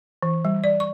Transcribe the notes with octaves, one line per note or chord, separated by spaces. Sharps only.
E3
G3
D5
C#6